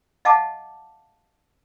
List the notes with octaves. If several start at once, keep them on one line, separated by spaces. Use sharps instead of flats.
D#5 F5 F#5 A5 D6